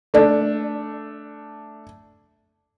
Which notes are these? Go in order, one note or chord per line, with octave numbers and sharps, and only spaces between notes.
A3 D4